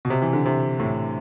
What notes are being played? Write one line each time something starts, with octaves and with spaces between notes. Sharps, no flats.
B2
C3
E3
D3
C3
A2